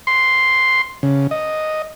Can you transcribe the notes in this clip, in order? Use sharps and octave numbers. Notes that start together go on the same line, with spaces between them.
C6
C#3
D#5